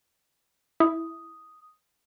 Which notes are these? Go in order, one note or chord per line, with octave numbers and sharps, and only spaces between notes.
E4 D#6